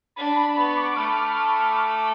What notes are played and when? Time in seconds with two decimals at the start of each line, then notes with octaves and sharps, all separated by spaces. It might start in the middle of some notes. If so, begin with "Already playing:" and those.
0.16 D4 B5
0.36 B5
0.57 B3 C#6
0.77 D6
0.96 A3 F6
1.77 D6